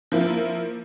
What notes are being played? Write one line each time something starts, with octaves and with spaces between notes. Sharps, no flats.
F3 A#3 E4